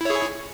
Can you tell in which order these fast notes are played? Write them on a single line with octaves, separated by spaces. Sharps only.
E4 C#5 G#4